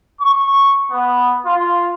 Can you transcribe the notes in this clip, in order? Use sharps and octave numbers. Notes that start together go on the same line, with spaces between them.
C#6
B3
F4